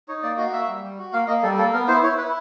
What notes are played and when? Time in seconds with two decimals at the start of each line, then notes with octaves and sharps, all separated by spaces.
0.08 D#4 C#5
0.23 A#3 D5
0.38 F#4 D#5
0.53 A#3 E5
0.68 G3
0.83 G3
0.98 F#4
1.13 A#3 F5
1.28 A#3 D#5
1.43 G3 A4
1.58 A#3 A4
1.73 B3 A#4
1.88 E4 C5
2.03 E4 C#5
2.18 E4 B4